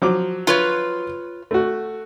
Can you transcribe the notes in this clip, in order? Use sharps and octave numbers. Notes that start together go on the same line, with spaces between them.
F3 F#3 D6
F4 B4 C#5
A3 F#4